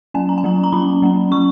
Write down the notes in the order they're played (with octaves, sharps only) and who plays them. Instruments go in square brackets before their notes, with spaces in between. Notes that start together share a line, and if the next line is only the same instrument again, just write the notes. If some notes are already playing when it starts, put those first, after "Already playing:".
[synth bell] F#3 A#3 C#4 G#5
A#5
G#5
F#3 A#3 C#4 A#5
A#5
F#3 A#3 C#4 B5
F#3 A#3 C#4
F#3 C#4 C#6